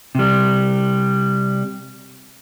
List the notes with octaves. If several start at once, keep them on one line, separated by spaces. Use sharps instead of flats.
C3 G3